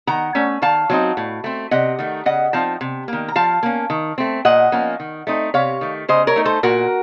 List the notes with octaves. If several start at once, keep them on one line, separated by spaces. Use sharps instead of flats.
D#3 F#5 A#5
A3 C#4
D#3 F5 A5
F#3 C4 D#4
A2
A3 C4
C3 D#5 F#5
D#3 A3 D#4
C#3 D#5 F#5
F3 C4 D#4 F5 A5
C3
D#3 A#3
A#5
F3 F5 A5
A#3 C#4
D#3
A3 C4
A#2 D#5 F#5
F3 A#3 C#4
D#3
A3 C4 D#4
C3 C#5 F5
D#3 A3
C#3 C5 D#5
A#4 C#5
A3 D#4
A4 C5
A#2 F#4 A#4